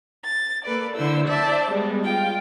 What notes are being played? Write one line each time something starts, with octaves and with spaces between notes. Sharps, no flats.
A6
A#3 A4 B4 D5
D3 E4 C5 E6
C5 D5 E5 A5
G3 G#3 B3
F4 G5